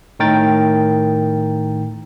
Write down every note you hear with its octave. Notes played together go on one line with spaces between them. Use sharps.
A2 D#3 A#4 G5 A6